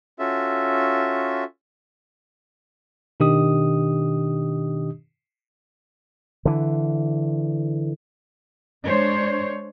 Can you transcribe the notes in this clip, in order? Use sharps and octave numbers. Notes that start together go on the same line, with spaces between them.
C#4 F4 F#4 A4 E5
B2 D#3 D4 G4 D#5 D#6
D3 E3
G#3 D4 C5 C#5